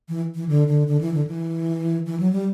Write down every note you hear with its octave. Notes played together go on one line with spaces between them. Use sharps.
E3
E3
D3
D3
D3
E3
D3
E3
E3
F#3
G3